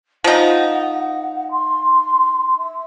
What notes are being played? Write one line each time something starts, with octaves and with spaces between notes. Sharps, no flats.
F3 D#4 F#5
C6
E5